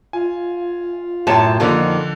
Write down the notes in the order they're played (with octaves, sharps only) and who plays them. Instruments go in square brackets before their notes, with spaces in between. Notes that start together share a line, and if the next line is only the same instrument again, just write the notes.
[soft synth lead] F4 [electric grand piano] G#5
[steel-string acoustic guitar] F#2 A2 A5 [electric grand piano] C5 G5
[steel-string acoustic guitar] F2 D#3 A#3 [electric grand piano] D3 F3 D4